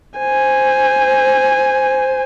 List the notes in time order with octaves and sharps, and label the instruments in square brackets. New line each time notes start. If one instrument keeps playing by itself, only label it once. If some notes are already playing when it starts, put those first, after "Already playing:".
[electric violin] C5 G#5